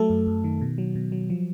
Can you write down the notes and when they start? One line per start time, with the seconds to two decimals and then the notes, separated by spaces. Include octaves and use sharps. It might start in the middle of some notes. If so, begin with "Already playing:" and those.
Already playing: F#3 A3 A4
0.10 F#2
0.27 F#2
0.44 D#3
0.61 B2
0.78 F#3
0.95 B2
1.12 F#3
1.30 F3